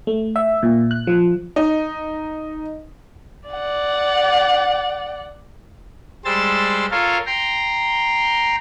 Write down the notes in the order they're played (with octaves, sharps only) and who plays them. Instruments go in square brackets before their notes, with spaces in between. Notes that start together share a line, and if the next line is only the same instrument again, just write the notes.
[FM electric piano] A3
E5
A#2
F#6
F3
[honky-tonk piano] D#4
[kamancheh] D5 F#5
[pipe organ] G3 G#3 C5 E6 A6
F4 A4 A#4 C#5 F5
G5 A#5 C6